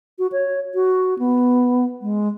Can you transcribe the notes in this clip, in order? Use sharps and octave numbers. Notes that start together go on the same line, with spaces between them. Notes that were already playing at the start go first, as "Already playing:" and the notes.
F#4
C#5
F#4
B3
G#3